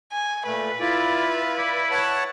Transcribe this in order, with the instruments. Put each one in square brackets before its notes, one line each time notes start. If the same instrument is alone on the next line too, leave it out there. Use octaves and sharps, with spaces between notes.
[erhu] G#5
[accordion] A#2 A3 [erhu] B4
[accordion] E4 F4 [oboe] D5
[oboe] E4 [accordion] D5
[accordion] C#5 F#5 A5